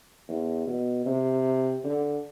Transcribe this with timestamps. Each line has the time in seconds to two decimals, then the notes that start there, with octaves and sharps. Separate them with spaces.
0.28 E2
0.67 B2
1.06 C3
1.84 D3